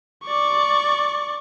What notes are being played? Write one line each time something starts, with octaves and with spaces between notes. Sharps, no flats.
D5 C#6